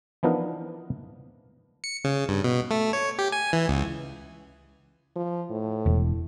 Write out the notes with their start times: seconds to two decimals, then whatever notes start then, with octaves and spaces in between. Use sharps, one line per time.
0.23 E3 F3 B3 D4 D#4 A#4
1.84 C#7
2.04 C#3
2.29 G2
2.44 B2
2.71 A3
2.93 C#5
3.19 G4
3.32 G#5
3.53 E3
3.69 C#2
5.16 F3
5.50 A2
5.86 E1